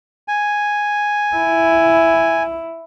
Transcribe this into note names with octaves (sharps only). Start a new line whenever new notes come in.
G#5
E4